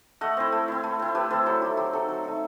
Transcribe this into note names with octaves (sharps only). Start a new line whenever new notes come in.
A3 D#5 F#5
C4 E4
A3
C4 E4
A3
C4 E4
A3 G4 B4
C4 E4 A4 C5
F#3 F#4 A4
A3 D#4 G4
F#3 G4
A3 D#4 F#4 A4
F#3
A3 D#4